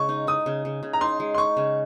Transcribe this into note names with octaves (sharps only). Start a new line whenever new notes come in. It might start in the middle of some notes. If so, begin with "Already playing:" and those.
Already playing: C#3 G#3 C#6
D#4
D#4 D#6
C#3
C#3
C#3
A#5
D#4 C6
G#3
C6
D#4 C#6
C#3